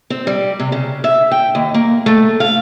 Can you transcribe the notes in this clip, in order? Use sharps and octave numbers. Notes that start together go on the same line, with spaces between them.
C4
G3
C3
C#3
E5
G5
D#2
A#3
A3
F5